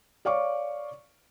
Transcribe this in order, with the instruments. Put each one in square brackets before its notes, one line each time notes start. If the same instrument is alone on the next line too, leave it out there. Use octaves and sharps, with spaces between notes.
[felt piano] C#5 D5 F5 C#6 D6